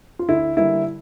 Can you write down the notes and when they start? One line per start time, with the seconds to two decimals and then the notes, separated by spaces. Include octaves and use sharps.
0.19 F4
0.29 D2 E4
0.57 D3 G3 A#3 E4